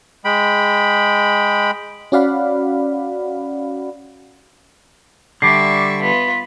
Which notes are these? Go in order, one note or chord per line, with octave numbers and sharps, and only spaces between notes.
G#3 G5 B5
C#4 F#4 D5 F5 F#5 B5
D3 G3 E5 C#6 D6 C7
B3 F4 B6